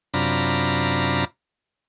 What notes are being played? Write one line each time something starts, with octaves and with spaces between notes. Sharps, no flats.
F#2 C3 D4 F4 A#5 B5